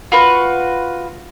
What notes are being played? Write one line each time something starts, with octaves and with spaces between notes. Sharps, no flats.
F4 F#4 B4 C#6